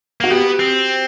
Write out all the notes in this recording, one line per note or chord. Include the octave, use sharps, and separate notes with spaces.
A#3 F#4
B3 G4
C4